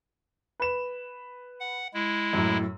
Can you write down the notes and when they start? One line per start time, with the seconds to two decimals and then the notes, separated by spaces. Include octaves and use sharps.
0.60 B4 E7
1.60 F#5
1.94 G#3 E4
2.33 F#2 A2